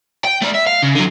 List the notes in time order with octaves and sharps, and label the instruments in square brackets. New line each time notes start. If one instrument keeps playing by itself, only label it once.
[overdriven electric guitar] G5
A3 D5
E5
F5
C#3
D3 F#3